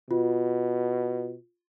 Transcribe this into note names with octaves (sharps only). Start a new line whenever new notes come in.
B2 F4